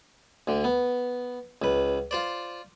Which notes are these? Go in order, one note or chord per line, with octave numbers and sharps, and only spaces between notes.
D2 D3
B3
C#2 B4
F4 C5 D5